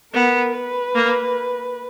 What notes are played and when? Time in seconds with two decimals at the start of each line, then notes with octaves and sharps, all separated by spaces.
0.13 B3 A#4
0.54 B4
0.95 A#3